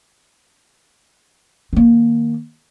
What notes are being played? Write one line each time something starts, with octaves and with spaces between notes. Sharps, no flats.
D#3 A#3